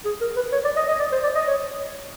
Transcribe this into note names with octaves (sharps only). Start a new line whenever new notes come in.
G#4
A#4
B4
C#5
D5
D#5
D#5
D5
C5
D5
D#5
C#5